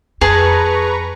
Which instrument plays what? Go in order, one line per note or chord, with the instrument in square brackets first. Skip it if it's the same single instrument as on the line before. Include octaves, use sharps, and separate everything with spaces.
[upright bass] F2 [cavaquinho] G#4 A5 [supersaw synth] B4 A#5 C#6